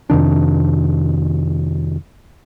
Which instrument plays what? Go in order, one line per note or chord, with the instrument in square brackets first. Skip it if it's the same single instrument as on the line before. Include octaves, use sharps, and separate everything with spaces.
[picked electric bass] F2 C3 D#3 D4